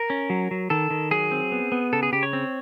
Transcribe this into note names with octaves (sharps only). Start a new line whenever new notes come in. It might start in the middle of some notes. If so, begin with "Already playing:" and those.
Already playing: A#4
C#4
F#3
F#3
D#3 A4
D#3
F#3 G#4
C4
B3
B3
C#3 A4
G#4
C#3 G4
C#5
C4